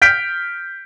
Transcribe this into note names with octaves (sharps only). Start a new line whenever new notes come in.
F6 G6 B6 D7